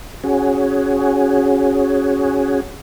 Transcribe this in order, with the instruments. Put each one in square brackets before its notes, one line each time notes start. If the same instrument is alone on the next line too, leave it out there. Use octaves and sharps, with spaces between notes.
[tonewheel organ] C#4 F#4 G#4